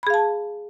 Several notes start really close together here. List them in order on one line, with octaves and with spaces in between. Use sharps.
B5 G#4 F5 A5